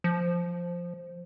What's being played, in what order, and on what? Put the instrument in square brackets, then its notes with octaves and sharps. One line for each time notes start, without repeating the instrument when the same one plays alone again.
[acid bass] F3